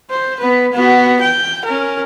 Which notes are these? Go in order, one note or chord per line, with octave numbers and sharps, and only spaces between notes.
C5
B3 B4
B3 F#4
G5
C#4 A#4